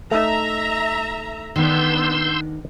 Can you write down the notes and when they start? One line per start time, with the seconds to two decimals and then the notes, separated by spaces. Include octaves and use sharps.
0.11 A3 D#4 E5 A#5
1.56 D#3 B3 D4 C6 E6 G6